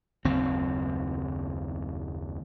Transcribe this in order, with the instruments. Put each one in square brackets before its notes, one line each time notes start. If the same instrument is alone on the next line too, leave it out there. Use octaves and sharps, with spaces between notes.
[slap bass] F#1 D#2 C4